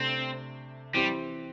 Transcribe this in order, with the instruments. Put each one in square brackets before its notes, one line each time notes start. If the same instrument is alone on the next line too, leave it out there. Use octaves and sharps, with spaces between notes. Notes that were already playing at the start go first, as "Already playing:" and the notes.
Already playing: [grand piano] C3 A3 D4 [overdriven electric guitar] C4
[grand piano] E3 C4 G4 [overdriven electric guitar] G3